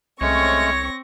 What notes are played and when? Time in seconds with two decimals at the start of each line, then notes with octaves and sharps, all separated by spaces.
0.21 C2 G#3 A3 C4 C#4 C#5 C#6 A#6